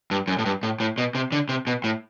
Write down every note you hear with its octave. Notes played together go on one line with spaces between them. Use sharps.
G2
F#2
A2
G2
A2
A2
B2
C3
D3
C3
B2
A2